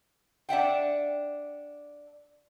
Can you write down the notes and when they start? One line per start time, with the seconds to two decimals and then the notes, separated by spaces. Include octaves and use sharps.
0.49 D4 E5 F#5 G5